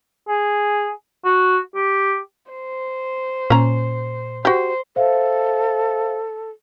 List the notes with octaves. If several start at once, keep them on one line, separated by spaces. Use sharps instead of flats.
G#4
F#4
G4
C5
A#2 C#4 A#5
F#4 G4 C5
A4 C5 E5 F5